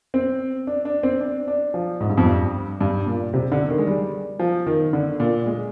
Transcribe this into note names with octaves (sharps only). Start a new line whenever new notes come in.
C4
D4
D4
C4
D4
D4
F3
G#2
G2
F2
G2
G2
A#2
C3
D3
D#3
G#3
G3
F3
D#3
D3
A#2
G#3